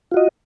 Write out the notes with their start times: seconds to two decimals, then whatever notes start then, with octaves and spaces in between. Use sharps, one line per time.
0.11 F4
0.14 F#4
0.17 D#5